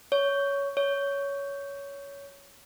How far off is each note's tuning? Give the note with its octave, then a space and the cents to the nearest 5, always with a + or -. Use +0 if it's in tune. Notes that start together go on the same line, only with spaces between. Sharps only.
C#5 +15
C#5 +15